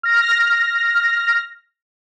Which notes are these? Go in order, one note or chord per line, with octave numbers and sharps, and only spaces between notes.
F6 A#6